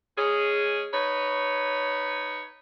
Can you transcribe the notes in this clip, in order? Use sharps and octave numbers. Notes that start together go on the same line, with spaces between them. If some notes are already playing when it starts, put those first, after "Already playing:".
G#3 C#4 G#4
D#4 B4 C#5